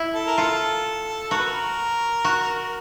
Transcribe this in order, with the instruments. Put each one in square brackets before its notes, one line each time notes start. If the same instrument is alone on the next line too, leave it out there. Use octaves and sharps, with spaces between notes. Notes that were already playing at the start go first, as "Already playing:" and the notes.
Already playing: [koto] E4
[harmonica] A4
A#4
[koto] F4 [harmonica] A4
[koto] F#4 [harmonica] A#4
[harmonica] B4
A#4
[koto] F#4